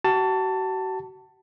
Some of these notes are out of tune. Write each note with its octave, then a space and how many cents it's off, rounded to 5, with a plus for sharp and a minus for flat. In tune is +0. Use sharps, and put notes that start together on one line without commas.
F#4 +40 A5 +15